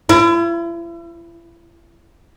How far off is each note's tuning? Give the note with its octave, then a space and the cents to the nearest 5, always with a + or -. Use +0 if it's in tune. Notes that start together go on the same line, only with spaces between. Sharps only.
E4 +40